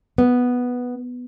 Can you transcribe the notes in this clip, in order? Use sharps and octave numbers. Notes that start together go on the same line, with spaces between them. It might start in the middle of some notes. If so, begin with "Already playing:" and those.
B3